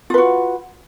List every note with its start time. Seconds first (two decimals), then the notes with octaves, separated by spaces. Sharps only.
0.10 F4
0.14 B4
0.18 F#4